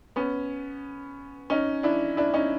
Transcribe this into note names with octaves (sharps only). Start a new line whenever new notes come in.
B3 C#4
C#4 D#4
D4 E4
D4 E4
C#4 D#4